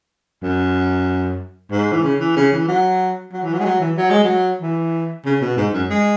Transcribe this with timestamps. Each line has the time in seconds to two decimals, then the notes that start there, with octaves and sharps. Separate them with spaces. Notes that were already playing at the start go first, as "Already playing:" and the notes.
0.43 F#2
1.71 G#2
1.92 E3
2.03 C#3
2.20 E3
2.36 C#3
2.52 E3
2.68 F#3
3.32 F#3
3.43 E3
3.54 F#3
3.60 G#3
3.65 F#3
3.80 E3
3.97 F#3
4.10 G#3
4.24 F#3
4.61 E3
5.25 C#3
5.41 B2
5.57 G#2
5.73 F#2
5.90 G#3